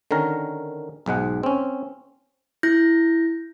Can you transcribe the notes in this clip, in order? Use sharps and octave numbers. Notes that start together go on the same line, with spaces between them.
D3 D#3 C#4 A#4
B1 G#2 G#3 F#5
C4 C#4
E4 G6 A#6